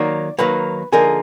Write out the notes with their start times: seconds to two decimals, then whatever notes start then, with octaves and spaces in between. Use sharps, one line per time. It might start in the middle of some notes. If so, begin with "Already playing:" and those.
Already playing: D#3 F#3 A#3 D5
0.39 D#3 F#3 A#3 B4
0.92 D3 F3 A#3 D#4 G#4 A#4